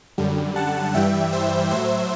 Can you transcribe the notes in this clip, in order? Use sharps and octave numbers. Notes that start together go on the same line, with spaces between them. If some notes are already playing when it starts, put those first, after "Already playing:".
F#2 D3 G3
F#5 A5
G2 E3 G3 E5 G5
C5 E5
A2 F#3 C5 E5